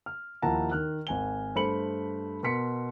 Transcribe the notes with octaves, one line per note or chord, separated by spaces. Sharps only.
F6
D#2 F3 E4 F#5 A5 A#5
D#3 F6 F#6
G#1 G#5 G7
G2 A3 C5 B5 C#7 F#7
B2 A#4 C6 B6 C#7